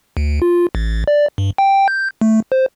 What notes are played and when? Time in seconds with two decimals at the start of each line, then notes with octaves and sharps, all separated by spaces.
0.17 D2
0.42 F4
0.75 A1
1.08 D5
1.38 G2
1.58 G5
1.88 G6
2.21 A3
2.52 C5